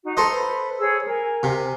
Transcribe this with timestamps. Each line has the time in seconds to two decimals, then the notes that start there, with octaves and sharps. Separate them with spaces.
0.03 D#4 F#4
0.17 A4 C5 D#5 A#5
0.31 B4
0.78 G#4 C#5 E6
1.05 A#4 G#5
1.43 C3